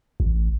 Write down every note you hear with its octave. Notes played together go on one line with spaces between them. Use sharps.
A1